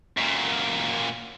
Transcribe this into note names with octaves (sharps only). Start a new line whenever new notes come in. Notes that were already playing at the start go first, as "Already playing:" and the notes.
F#2 A#2